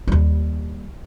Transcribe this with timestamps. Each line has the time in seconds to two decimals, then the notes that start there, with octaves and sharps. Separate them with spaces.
0.07 D#2 G3